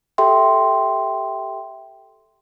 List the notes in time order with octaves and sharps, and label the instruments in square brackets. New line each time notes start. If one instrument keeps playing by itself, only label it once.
[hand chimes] G4 A4 E5 G5 C6